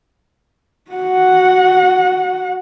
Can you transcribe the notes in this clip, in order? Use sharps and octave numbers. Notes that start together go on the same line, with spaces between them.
F#4 F#5